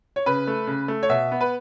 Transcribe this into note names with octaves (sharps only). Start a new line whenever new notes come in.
C#5
C#3 B4
A3
C#3
A3
C#5
B2 E5
B3
B4